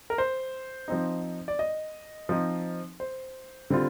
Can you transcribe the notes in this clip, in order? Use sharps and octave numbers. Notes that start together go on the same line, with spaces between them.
A#4
C5
F3 C4 D#4
D5
D#5
F3 C4 D#4
C5
D3 G3 C4 F4